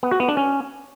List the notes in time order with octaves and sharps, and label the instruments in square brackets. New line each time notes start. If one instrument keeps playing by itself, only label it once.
[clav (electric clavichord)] B3
F#4
B3
D4
C#4